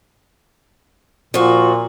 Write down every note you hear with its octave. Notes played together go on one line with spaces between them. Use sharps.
A#2 F3 F#4